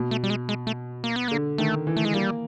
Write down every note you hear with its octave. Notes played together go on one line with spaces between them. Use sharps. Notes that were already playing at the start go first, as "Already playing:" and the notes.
Already playing: B2
A3
G3
G#3
G#3
A3
A#3
B3
D3 A#3
D#3 A3
E3
A3
G#3
G3 A#3